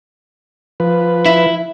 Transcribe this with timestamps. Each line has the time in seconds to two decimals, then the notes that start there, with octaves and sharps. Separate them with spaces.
0.80 F3 B4
1.26 E4